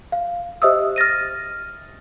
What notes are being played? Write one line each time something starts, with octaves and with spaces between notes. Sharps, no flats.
F5
G4 C5 D#5 E5 D#6 E6
F6 A6 A#6 D#7